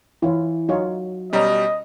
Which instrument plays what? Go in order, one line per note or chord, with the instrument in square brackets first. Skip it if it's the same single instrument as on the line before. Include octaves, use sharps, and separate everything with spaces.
[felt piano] E3 C#5 [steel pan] E4 F4
[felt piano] F#3 [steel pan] D#4 F4 C#5
[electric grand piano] B2 G3 [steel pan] C#4 A#5 [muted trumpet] D#5